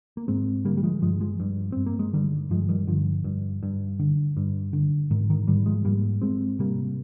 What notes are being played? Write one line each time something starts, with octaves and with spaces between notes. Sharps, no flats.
A#3
G#2 G#3 C4
D3 G3 A#3
G3
F3 G#3
G2 F3 G#3
F3 G#3
G2
G2 C4
A#3
G#3
D3 D#3 G3
G2 F3 G#3
D#3 G3
G2 D3 F3
G2
G2
D3
G2
D3
G#2 D#3
D#3
G#2 D#3 G3
F3 G#3
G#2 G3 A#3
G#2 G#3 C4
C3 G3 A#3